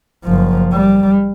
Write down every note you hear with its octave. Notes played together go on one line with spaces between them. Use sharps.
F#1 F3
G3